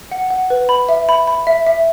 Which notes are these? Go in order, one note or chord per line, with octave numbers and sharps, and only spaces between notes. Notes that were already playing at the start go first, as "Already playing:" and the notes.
F#5
F#5
B4
B5
E5
B5
B5
E5
E5